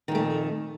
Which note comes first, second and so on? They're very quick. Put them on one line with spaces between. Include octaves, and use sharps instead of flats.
D#3 A#2 A3 F2